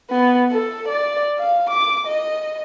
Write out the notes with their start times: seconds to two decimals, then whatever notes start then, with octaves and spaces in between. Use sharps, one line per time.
0.11 B3
0.52 A4
0.88 D5
1.39 F5
1.70 D6
2.07 D#5